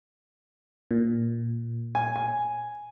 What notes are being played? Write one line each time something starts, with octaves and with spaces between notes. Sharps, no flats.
A#2
G#5
G#5